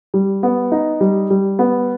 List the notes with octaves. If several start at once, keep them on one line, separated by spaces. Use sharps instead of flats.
G3
B3
D#4
G3
G3
B3